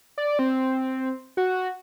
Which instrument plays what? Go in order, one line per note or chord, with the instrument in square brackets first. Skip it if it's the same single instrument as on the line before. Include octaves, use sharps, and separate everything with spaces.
[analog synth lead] D5
C4
F#4